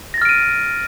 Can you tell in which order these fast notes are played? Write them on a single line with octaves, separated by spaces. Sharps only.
A#6 A6 F6 D7 D#7